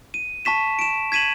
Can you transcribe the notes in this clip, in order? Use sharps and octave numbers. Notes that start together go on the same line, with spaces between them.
D#7
A5 C#6 B6 E7
D7 E7
G#6 B6 D#7 E7 F#7